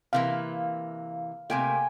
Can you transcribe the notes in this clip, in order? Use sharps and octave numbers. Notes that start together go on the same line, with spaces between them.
C3 E3 A#3 F5
C3 A3 A#3 G5 G#5